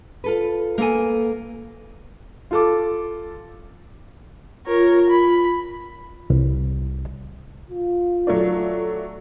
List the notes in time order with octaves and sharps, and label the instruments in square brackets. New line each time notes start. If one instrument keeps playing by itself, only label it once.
[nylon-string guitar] F4 A4 B4
A#3 B3 A4 G#5
[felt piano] F4 A4 D6
[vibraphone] F4 [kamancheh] A#4 C#5
[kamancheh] B5
[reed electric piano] C2
[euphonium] F4
[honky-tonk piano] F#3 A3 D4